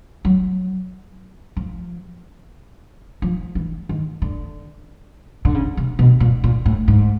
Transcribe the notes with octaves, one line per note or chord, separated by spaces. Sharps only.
F#3
F3
F3
E3
D#3
D3
D3
C#3
C3
B2
A#2
A#2
A2
G#2